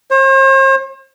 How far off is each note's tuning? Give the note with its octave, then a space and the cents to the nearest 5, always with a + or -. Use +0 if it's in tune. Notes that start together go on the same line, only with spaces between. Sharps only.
C5 +45